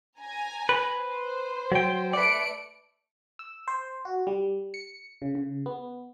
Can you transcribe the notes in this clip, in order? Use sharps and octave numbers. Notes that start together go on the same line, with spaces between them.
G#5 A#5
B4
C5
F#3 G5
A3 B4 D5 C#7 D7
E6
C5
F#4
G3
C#7
C#3
C#3
B3